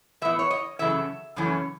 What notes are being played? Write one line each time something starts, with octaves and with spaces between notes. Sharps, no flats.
A2 E3 B3 E5
C#5
D#5
F#2 C#3 E3 A3 C#4 E5
F#2 C#3 E3 A3 C#4